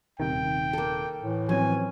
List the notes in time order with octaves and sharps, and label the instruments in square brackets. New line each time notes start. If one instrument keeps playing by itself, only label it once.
[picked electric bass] D#1 C3 D#3 [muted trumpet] G5
[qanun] A#3 A4
[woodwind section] A2 E3
[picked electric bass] F3 F#3 C4 [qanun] C#4 [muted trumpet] G#5